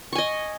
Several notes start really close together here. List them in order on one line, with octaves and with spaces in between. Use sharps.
C#6 G#5 D#5